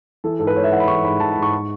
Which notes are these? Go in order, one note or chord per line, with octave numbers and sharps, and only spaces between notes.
E3 A4
G#2 A4
B4
G#2 C#5
E5
E3 F#5
B5
E3 C#6
G#2 B5
E3 A5
B5
G#2
C#6
C#6